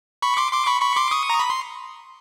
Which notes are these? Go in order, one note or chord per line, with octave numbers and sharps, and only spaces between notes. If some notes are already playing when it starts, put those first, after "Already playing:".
B5 C#6
C6 D6
C6 D6
B5 C#6
B5 C#6
C6 D6
C#6 D#6
A#5
B5
C6